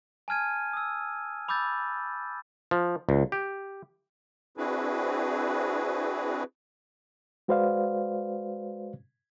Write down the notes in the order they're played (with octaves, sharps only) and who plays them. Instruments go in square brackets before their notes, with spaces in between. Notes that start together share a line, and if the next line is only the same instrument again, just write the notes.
[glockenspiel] G#5 A5 F6 G#6 D#7
D#6 E6
B5 D6 E6 G6 A6
[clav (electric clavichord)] F3
C#2
G4
[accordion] C4 D4 E4 F#4 G#4 B4
[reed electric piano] G#3 F#4 B4 C5 D5 F5